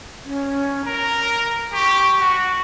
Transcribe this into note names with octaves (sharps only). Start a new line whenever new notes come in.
C#4
A#4 A#5
G4 C#6
F#4